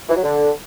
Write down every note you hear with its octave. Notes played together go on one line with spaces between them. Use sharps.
E3
F#3
D3